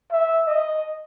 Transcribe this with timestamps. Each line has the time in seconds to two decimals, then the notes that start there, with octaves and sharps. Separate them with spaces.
0.12 E5
0.47 D#5